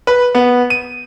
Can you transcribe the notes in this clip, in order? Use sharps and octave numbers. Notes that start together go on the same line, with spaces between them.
B4
B3
D#7